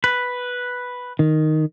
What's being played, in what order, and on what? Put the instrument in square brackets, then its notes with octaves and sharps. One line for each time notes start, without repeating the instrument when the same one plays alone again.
[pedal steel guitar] B4
[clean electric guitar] D#3